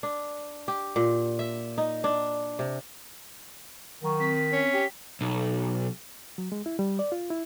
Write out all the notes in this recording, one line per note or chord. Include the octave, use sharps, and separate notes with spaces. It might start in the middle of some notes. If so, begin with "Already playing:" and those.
D4
G4
A#2
E5
D#4
D4
C3
D#3 F#3 A#5 C#6
C4 B6
C#4
G4 G5
B1
F#3
G#3
E4
G3
D5
F4
E4